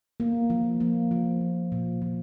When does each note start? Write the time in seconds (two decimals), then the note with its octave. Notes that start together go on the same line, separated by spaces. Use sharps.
0.20 A#3
0.50 F3
0.80 A#3
1.11 F3
1.41 A#3
1.72 A#2
2.02 F3